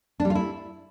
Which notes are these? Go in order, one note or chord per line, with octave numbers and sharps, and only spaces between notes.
D4
G3
F4
E4